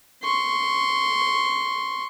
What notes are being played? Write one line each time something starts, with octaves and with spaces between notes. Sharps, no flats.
C6 C#6